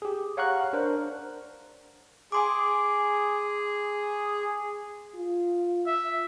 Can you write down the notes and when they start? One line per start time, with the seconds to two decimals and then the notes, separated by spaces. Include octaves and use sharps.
0.02 G4 G#4
0.37 C#5 F5 F#5 A#5 C#6 F#6
0.73 D4 A#4 C5
2.32 G#4 G#5 C6 D6
5.15 F4
5.87 E5